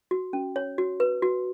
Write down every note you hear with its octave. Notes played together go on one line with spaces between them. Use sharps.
F#4
C#4
C#5
F#4
B4
F#4